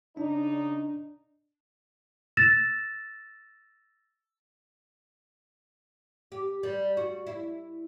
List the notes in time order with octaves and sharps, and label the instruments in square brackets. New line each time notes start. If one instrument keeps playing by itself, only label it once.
[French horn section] C#3 D5 [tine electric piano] D4 [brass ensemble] D#4
[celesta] E6 A6 A#6 E7
[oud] G4
G3
F#4
E4